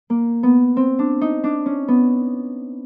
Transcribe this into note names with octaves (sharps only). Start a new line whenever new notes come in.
A#3
B3
C4
D4
D#4
D4
C#4
B3